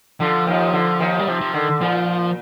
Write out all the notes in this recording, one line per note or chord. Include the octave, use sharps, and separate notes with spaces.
D3 F3
D#2 D#3
D3
D#2 D#3
G3
C3 F3
F3
D3 D#3
A#2 F3